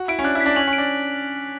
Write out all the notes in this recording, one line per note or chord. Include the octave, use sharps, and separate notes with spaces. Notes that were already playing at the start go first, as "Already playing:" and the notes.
Already playing: F#4
E4 D7
C#4
D4 F#6
E4
B6
D4
C#4 F#7
C#4
D7
D4